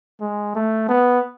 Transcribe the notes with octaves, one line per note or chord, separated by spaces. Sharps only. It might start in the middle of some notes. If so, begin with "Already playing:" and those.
G#3
A3
B3